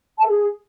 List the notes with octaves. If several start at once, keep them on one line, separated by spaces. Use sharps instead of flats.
A5
A4
G#4